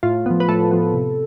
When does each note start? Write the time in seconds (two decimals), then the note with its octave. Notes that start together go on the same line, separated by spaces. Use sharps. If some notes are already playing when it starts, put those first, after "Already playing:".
0.03 A2 F4
0.26 F3 B3
0.40 B4
0.49 A2 A4
0.71 F3 B3
0.94 C3